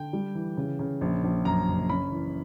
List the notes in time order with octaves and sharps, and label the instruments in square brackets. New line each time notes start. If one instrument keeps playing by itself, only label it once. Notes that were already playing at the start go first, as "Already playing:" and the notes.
Already playing: [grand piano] D3 G5
G3
E3
C#3
C#3
A#1
A#1
F#2 A#5
F#1
C#4 B5
E3